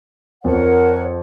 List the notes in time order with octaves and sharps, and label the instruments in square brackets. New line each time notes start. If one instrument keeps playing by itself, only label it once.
[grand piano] F2 [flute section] A#4 C#5 F#5